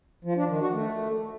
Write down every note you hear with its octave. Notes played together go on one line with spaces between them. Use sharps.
F3
D4
D#3
F#4
A3